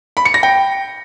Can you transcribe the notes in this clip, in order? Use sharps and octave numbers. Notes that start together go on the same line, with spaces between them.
B5
C#7
A#6
G5